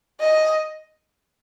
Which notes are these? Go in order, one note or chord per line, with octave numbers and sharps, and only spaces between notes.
D#5